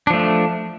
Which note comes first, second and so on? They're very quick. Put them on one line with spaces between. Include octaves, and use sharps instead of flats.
D4 F3 A3